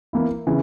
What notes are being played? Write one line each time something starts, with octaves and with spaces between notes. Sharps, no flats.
E3 A#3 E4
C#3 E3